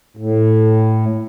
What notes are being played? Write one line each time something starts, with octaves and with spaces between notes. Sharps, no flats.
A2